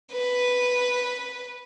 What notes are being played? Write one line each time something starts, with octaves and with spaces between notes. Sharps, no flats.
B4